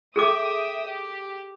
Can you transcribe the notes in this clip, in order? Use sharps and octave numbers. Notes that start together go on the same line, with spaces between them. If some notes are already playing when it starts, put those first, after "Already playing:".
G#4 A4 E5 G5 D6 D#6
G4